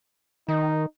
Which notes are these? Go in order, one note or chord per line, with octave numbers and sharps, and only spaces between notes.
D#3 D#4